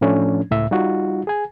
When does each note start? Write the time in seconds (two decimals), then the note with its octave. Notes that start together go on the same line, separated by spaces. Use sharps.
0.01 A2 F3 A3 C#4 D4
0.51 C#2 A2 E5
0.71 G3 D#4 F4 F#4
1.27 G#4 G#5